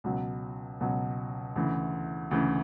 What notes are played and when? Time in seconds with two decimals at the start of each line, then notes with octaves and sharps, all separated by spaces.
0.04 C#2 B2 F#3
0.80 C#2 B2 F#3
1.56 D2 C#3 E3
2.31 D2 C#3 E3